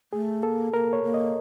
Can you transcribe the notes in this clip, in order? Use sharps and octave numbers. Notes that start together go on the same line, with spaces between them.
A3 G#4
A#3 A4
A#3 A#4
C#5
A#3
D#5